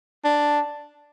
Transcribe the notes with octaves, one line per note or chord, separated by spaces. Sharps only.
D4